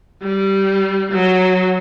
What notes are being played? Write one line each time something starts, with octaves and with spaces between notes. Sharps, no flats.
G3
F#3